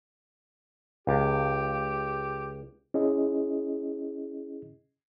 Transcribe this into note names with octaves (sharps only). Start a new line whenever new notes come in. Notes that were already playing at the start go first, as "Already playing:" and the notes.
C#2 G4
C#4 E4 G#4 D#5